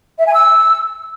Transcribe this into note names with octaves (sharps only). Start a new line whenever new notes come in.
E5
G#5
E6